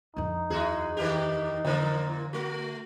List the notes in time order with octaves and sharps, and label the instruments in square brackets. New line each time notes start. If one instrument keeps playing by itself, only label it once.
[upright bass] F2 D4 [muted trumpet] D#4
[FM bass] D#2 [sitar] E4 F#4 G#4
[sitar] D#3 A#3 G4
[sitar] A#2 E3 A#3 [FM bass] D3
[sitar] A3 F#4